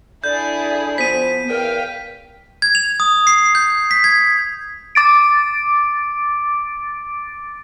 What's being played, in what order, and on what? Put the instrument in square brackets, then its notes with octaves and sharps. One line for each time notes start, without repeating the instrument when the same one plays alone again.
[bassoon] D3 [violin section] E4 G#4 [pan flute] D5 [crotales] G6
[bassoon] F3 [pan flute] B3 [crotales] B6 D#7
[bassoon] E2 [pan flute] A#4 [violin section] F5 G5
[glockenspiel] G#6
F7
D#6
C7
G6
B6
G#6
[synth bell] D6 A6 D7